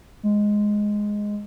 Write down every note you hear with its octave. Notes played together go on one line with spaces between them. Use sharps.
G#3